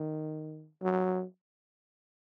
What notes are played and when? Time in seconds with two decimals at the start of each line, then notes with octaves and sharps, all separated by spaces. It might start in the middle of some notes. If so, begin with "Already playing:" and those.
Already playing: D#3
0.82 F#3